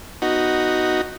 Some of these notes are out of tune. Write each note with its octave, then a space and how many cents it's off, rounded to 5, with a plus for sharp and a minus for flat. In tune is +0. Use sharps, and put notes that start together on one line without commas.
B3 +0 D#4 +0 F#4 +0